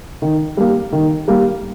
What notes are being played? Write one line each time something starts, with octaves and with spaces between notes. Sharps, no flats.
D#3
G3 A#3
D#3
G3 A#3